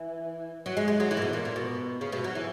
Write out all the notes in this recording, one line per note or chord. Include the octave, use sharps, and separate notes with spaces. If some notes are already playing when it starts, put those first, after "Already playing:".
Already playing: E3
F#3
G#3
G#3
F#3
E3
A#2
B2
A#2
A#2
B2
C#3
B2
F#3
E3